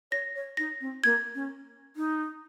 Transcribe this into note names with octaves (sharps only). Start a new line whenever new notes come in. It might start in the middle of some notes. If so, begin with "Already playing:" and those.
C#5 A#6
C#5
D#4 A#6
C4
A#3 G#6
C#4
D#4